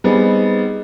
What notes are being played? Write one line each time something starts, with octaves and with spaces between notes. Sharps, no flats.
G3 B3 C4 D#4 G#4